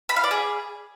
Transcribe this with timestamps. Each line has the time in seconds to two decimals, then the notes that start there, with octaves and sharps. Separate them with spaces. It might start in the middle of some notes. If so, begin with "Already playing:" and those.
0.09 B5
0.16 F5
0.24 D5
0.31 G#4